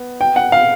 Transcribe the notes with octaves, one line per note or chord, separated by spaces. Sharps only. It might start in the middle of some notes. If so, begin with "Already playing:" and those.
Already playing: B3
G5
F#5
F5